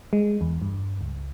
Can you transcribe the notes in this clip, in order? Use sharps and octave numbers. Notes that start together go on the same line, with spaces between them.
G#3
E2
G2
C#2